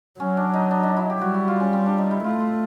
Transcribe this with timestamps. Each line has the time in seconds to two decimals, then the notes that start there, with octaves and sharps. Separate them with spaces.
0.20 F#3 C#4
0.37 D4
0.54 D#4
0.71 D4
0.83 D#4
0.97 E4
1.10 G4
1.21 G3 F#4
1.35 F#4
1.48 F4
1.60 C#4
1.73 C4
1.86 D4
1.98 D#4
2.11 E4
2.24 A3 F4
2.40 F4